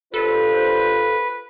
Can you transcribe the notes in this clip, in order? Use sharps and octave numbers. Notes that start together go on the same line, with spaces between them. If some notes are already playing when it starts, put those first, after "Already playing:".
D4 F4 G4 A4 B4 C5